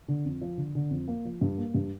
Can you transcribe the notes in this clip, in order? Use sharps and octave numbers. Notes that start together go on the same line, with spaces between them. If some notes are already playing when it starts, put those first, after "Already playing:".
D3
F2
F3
D3
D3
F2
A#3
F3
G2
A#3
G2